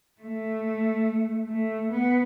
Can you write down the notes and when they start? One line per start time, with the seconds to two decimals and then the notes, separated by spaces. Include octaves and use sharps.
0.21 A3
1.49 A3
1.91 B3